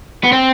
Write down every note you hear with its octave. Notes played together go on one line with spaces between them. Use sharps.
B3
C4